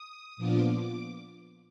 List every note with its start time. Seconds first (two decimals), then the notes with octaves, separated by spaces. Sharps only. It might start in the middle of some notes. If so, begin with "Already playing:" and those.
Already playing: D#6
0.37 A#2 F3 B3 D4 F4 D6